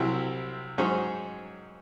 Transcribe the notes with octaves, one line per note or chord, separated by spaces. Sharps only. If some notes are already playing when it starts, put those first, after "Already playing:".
Already playing: C2 C3 F#3 C4 E4
G#2 F#3 C#4 G#4 C5